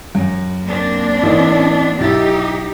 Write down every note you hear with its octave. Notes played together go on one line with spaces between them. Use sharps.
F#2
A#3 C4 D4
A1 E3 D#4
B1 D#4 E4 G4 A6